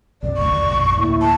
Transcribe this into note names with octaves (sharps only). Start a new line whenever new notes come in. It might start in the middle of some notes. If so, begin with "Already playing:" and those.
B1 F#2 C3 D5
F#1 D2 A2 C#6
C2 F2 D#3
A#1 F#2 B2
D2 A2 A#3 E4
A5